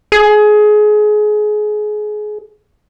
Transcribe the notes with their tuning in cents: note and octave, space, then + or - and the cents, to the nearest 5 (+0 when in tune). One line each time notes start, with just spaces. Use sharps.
G#4 +25